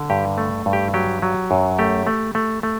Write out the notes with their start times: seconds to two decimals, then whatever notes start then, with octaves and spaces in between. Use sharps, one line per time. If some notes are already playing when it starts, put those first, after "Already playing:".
Already playing: D3
0.10 G2 G4
0.38 A3
0.66 G2
0.73 G4
0.94 F#3 G4
1.22 F#3
1.51 F#2
1.79 A3 G4
2.07 A3
2.35 A3
2.63 A3